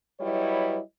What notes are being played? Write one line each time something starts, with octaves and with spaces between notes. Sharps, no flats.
F#3 G3 E4 B4 C#5 D#5